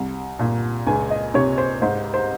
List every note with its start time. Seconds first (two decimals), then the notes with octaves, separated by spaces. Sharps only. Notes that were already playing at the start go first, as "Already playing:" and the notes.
Already playing: C2
0.39 A#2
0.87 C#2 G#5
1.10 D#5
1.34 C3 C#5
1.58 C5
1.82 G#2 C5
2.14 C5